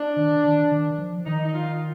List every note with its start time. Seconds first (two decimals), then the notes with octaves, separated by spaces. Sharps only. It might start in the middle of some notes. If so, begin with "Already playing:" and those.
Already playing: D4
0.17 D#3
0.44 D#3
0.72 D#3
0.98 F3
1.26 D#3 D#4
1.45 D#4
1.54 F4